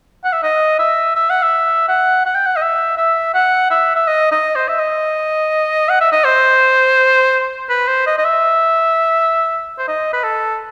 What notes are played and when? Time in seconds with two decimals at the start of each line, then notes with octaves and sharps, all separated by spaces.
0.24 F#5
0.33 E5
0.43 D#5
0.79 E5
1.16 E5
1.30 F#5
1.43 E5
1.89 F#5
2.25 F#5
2.35 G5
2.46 F#5
2.56 D#5
2.62 E5
2.97 E5
3.34 F#5
3.71 E5
3.96 E5
4.07 D#5
4.31 D#5
4.56 C5
4.68 E5
4.79 D#5
5.89 F#5
6.01 E5
6.12 D#5
6.25 C5
7.70 B4
7.88 C5
8.07 D#5
8.18 D#5
8.25 E5
9.79 C5
9.88 D#5
10.13 B4
10.24 A4